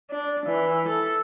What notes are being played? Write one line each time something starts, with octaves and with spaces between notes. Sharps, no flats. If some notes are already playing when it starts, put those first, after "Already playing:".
D4
E3
A4